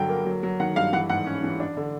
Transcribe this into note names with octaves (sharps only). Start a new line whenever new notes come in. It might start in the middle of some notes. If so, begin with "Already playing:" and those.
Already playing: G2 D3 F#3 G5
A#3
F#3
F#3
D#3 F#5
G2 F5
E3 F#5
G#2 F#5
C#4
E3
D4
D3